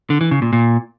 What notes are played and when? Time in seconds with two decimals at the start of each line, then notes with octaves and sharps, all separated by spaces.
0.10 D3
0.21 E3
0.31 C#3
0.42 A#2
0.53 A#2